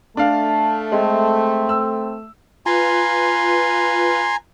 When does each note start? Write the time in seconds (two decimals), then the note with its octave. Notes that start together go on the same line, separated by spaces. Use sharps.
0.17 A3 D4 F5 A5
0.92 G#3 C4
1.69 E6
2.66 F4 B4 G#5 A#5 C6